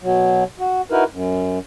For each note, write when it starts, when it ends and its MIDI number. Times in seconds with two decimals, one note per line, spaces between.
0.01 0.44 47
0.01 0.44 54
0.59 0.82 66
0.91 1.04 63
0.91 1.04 64
0.91 1.04 66
0.91 1.04 70
0.91 1.04 71
1.11 1.59 42